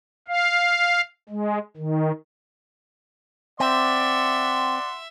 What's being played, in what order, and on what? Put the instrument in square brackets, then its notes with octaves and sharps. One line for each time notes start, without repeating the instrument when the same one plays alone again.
[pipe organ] F5
G#3
D#3
[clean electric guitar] C4 [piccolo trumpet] D5 [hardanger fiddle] E5 [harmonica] F#5 C6